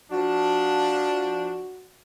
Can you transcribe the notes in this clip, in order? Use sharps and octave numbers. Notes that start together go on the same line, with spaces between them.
F3 D4 F#4